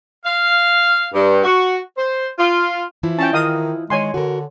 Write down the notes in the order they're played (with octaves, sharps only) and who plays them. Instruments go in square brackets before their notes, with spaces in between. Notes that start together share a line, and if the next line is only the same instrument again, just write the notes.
[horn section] F5
G2
F#4
C5
F4
[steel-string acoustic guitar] E3 F3 E4
[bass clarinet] C#4 [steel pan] G5 A5
[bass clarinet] D#3 [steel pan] D#5 F5 D#6
[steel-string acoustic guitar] D#3 [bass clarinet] G#3 [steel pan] C#5 G#5 C6
[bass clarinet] D3 [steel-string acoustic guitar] F#4 A#4